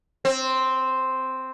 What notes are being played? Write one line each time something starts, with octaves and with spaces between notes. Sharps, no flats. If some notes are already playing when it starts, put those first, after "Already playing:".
C4